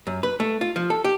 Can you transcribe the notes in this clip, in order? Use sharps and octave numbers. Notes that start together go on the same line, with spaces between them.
F#2
B4
A3
F4
F3
A4
G4